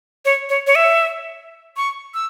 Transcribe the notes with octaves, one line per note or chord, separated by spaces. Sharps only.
C#5
C#5
C#5
E5
C#6
E6